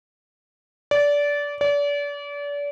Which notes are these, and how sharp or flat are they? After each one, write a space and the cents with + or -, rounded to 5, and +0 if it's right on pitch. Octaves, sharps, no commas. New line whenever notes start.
D5 -20
D5 -35